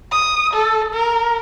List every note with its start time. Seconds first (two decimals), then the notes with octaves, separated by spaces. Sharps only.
0.12 D#6
0.53 A4
0.93 A#4